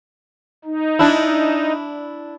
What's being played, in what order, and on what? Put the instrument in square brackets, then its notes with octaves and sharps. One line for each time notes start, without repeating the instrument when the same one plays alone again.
[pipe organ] D#4
[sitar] D4 E4